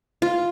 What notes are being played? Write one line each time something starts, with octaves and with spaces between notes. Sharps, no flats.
F4